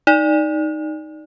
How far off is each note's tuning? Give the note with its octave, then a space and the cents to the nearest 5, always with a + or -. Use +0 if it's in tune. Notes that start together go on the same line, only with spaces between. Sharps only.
D#4 +0 D5 +0